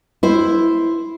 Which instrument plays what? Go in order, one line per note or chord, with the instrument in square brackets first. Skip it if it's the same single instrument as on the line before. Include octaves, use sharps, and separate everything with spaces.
[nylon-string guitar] E4 C5